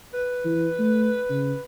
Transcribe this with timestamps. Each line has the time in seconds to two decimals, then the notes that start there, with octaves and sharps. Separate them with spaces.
0.14 B4
0.44 E3
0.79 A3
1.30 C#3